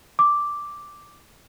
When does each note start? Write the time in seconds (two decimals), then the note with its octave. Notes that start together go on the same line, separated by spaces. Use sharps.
0.19 D6